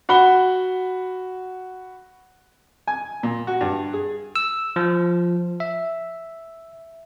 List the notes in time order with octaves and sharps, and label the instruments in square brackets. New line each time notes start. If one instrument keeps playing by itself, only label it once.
[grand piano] F#4 F#5 B5 G7
[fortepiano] G#5
A#2
F#4
G2
G#4
[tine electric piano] E6
F3
E5